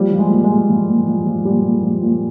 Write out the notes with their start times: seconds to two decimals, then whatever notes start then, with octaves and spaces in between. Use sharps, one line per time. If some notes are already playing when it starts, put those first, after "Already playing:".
Already playing: F3 G3
0.12 F3
0.19 G#3
0.31 A#2
0.44 G#3
0.50 A#2
0.70 F3
0.88 A#2
1.07 F3
1.27 F3
1.45 A#2 G3
1.64 A#2
1.83 F3
2.02 A#2